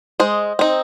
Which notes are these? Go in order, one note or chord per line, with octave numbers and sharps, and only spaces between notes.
G#3 C5 D#5
C4 D#4